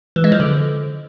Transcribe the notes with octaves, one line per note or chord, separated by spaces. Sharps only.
E3
G#3
F3
D3